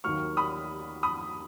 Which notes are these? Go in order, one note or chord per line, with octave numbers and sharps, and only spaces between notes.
D#2 D#3 F#3 A#3 C#6 F6
B5 D#6
B5 D#6